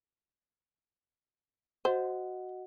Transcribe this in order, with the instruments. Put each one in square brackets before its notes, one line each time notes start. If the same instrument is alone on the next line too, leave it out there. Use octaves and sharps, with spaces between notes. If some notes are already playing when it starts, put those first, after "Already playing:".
[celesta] F#4 D#5 F#5 [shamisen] C5